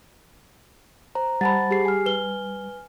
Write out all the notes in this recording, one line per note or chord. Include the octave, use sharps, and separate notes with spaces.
C5 A#5
G3 C5 F#5 A5 B5 A6
G4 G#4 C7
G#5 F6
B4 G7